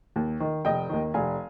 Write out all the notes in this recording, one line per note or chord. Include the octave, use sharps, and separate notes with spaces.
D#2
D#3
F1 D#5 G5
D#2 D#3
F1 F5 G#5